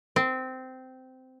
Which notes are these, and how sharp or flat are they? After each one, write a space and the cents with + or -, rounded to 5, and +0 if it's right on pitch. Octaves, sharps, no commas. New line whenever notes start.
C4 -15